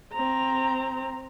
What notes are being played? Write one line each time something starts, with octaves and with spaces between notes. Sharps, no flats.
C4 A#5